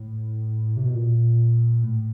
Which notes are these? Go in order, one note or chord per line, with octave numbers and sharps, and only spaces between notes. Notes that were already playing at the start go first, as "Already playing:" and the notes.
Already playing: A2
C3
B2
A#2
A2